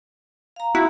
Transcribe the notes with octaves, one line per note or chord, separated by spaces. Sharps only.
F5 A#5
E4 F#4